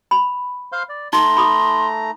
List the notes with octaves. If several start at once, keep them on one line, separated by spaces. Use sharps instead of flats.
B5
C5 F5 C6
D5
A3 D#4 A#5 C6
B5 D6 D#6